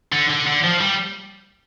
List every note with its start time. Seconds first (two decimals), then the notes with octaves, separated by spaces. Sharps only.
0.12 D3
0.30 D3
0.46 D3
0.63 F3
0.81 G3